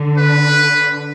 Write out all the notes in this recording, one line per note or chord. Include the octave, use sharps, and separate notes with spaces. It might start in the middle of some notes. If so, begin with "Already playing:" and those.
Already playing: D3
B4